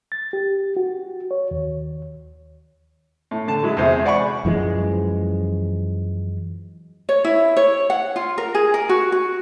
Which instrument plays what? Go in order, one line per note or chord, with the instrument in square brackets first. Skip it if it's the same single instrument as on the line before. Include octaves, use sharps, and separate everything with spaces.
[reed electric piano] A6
G4
F#4
C#5
D#2
[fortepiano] A2
D3 A5
F#3 G#3 E4
E2 C3 G#3 C5
D5 F#5 G#5 B5 C#6
[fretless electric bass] F#2 E3 F3 G#3
[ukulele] C#5
E4
C#5
F#5
F4
A#4
G#4
A#4
F#4
F#4